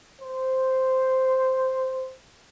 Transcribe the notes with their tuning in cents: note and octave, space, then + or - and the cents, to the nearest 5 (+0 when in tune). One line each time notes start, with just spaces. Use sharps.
C5 -5